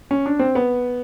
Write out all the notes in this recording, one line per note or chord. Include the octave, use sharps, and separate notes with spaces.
C#4
D4
C4
B3